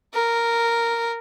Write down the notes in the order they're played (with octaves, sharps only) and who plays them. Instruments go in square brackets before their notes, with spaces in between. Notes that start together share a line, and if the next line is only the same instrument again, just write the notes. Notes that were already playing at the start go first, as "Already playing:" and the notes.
[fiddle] A#4